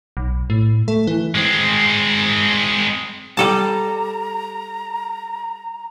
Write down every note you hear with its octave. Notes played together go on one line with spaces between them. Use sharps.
B1
A2
A3
E3
G#3 C4
G3 A4 A5 A#5